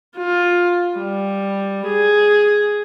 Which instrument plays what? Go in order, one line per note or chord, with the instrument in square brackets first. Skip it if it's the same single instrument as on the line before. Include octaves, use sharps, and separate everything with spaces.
[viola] F4
G3
G#4